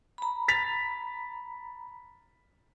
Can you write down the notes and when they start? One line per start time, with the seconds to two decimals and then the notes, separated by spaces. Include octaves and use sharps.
0.18 A#5 B5
0.48 A6 B6 F7